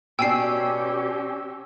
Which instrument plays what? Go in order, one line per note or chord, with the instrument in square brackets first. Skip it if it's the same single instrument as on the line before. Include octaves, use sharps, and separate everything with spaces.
[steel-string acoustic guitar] B2 D4 [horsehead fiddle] C#4 G4 [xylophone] G5 G#5 C7 [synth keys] E6